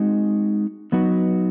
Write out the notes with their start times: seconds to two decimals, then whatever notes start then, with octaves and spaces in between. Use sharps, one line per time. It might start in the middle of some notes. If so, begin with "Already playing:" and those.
Already playing: G#3 C4 D#4 F#4
0.92 F#3 B3 D#4 F#4 B4